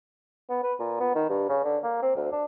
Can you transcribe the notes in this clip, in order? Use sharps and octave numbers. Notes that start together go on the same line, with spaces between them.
B3
B4
A#2
B3
D#3
G2
C#3
D3
A#3
C4
D2
D4